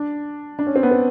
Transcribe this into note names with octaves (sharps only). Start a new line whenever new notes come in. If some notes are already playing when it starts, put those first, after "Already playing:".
Already playing: D4
D4
C#4
C4
B3
C4